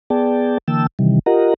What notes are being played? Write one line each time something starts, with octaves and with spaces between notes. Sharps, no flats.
B3 G#4 D5 G5 A5
D3 E3 A#3 G5 A5 E6
C3 D#3 E3 G3
F4 G4 A#4 D#5 F#5 A#5